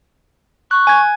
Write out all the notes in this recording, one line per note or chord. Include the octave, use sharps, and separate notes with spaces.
C#6 F#6
G#5 G#6